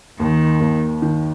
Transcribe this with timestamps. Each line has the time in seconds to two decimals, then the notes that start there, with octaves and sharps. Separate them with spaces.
0.19 D#2 D#3
0.60 D#2
1.02 D#3